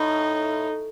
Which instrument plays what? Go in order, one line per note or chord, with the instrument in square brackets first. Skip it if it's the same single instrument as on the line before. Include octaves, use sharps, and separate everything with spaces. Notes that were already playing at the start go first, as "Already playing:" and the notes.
Already playing: [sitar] A2 [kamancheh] D#4